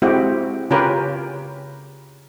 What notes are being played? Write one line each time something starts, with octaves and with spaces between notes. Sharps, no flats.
G#3 C4 E4 F#4 G4
C#3 C#4 F4 G4 A#4 B4